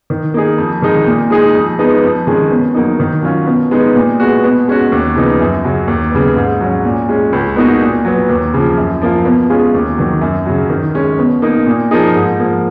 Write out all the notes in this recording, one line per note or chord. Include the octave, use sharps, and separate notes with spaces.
D#3
A#3 D#4 G#4
F2
D#3 G#3 D#4
A#2
G#3 D#4 G#4
F2
F3 G#3 B3 D#4
F2
D#3 G#3 C#4
B2
F#3 A#3 D#4
D#3
F#3 C#4 F4
B2
G#3 B3 D#4 G#4
A#2
G#3 B3 F#4
B2
G#3 C#4 F#4
D#2
C#3 F3 B3 D#4
F#2
C#3 F#3
D#2
C#3 F#3 B3
G#2
F#3 C#4
A#2
G#3 C#4
C#2
B2 A#3 D#4 F#4
A#2
F#3 B3
D#2
C#3 F3
F#2
F3 A#3 F4
B2
G#3 C#4 F4 G#4
D#2
D#3 F#3
F#2
C#3 F#3
D#3
G#3 C#4
B2
A#3 D#4
A#2
F3 A#3 D#4 G#4
G#2
F3 A#3